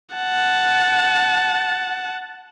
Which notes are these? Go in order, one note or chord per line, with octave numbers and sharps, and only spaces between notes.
F#5 A5